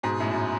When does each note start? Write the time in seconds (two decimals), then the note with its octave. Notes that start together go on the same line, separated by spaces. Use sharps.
0.03 G#2 B2
0.20 F#2 A2
0.31 F#2